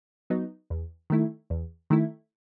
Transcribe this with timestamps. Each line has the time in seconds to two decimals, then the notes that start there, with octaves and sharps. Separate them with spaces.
0.30 F#3 B3 D#4
0.70 E2
1.10 D#3 A3 E4
1.50 E2
1.90 D#3 A3 E4